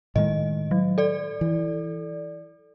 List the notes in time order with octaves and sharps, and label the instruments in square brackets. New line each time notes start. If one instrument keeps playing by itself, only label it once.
[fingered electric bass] A2 D#3 G#3 [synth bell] D#5
[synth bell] F#3
A4 D5
[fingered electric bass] E3